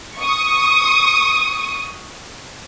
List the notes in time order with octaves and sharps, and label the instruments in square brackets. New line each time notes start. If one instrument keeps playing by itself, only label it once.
[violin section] C#6 D#6